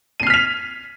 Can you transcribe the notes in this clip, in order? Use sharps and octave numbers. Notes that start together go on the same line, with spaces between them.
F6 B6 C7 D#7 F7